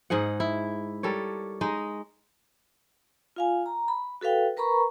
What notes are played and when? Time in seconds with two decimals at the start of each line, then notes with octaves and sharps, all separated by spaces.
0.10 G#2 D#4 G#4 F#5
0.40 E4
1.03 G3 A4 A#4 C#5
1.61 G#3 D#4
3.36 F4 F5 G#5
3.66 A#5
3.88 B5
4.21 F#4 A4 B4 F5 G5
4.57 A#4 B4 A#5 B5 C#6